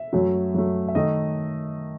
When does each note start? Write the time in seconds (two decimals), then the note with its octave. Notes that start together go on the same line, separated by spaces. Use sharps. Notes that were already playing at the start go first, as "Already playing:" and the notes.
Already playing: E5
0.13 F#2 F#3 A3
0.54 F#2 F#3 A3
0.88 E5
0.95 D#3 A3 D#5